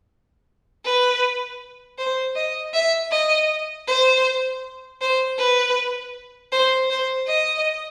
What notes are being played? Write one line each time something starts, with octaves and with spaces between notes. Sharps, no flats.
B4
C5
D#5
E5
D#5
C5
C5
B4
C5
C5
D#5